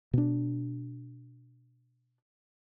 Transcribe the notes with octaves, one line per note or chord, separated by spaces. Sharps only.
B2 D4